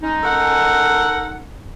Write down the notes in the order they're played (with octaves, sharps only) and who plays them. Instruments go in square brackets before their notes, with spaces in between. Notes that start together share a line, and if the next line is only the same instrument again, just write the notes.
[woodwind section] G#3 C#4 D#4
[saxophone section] A4 A#4 F#5